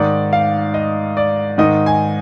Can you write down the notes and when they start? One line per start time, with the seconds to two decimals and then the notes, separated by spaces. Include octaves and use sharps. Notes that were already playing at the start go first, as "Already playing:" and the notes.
Already playing: G#2 D#3 D5
0.33 F5
0.74 D#5
1.17 D5
1.58 G#2 D#3 D#5
1.86 G#5